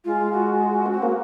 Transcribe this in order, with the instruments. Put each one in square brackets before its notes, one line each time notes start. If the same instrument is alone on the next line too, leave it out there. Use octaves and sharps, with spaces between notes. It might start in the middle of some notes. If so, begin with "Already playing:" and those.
[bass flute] G#3 [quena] F4
[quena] F#4
[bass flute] C#4
C4
A#3